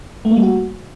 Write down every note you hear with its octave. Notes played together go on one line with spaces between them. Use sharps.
A3
A#3
G3
F#4